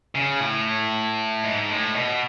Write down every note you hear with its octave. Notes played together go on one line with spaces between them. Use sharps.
C#3
A2
G#2
A2
B2